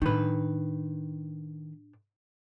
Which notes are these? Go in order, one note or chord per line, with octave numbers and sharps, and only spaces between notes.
A2 D#3 D4 B4